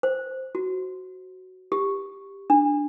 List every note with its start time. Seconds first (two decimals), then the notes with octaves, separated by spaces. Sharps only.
0.03 C5
0.55 F#4
1.72 G4
2.50 D4